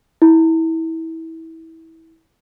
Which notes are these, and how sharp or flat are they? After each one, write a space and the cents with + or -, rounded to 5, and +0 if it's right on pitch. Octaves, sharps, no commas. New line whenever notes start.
E4 -25